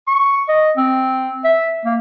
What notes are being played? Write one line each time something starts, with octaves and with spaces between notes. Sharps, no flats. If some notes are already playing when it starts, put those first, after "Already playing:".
C#6
D#5
C4
E5
A#3